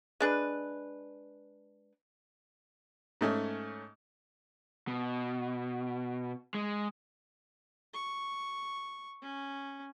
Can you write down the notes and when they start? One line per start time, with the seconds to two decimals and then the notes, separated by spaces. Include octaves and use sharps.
0.20 G#3 D4 B4
3.21 G#2 A3 C#4
4.88 B2
6.54 G#3
7.94 C#6
9.22 C#4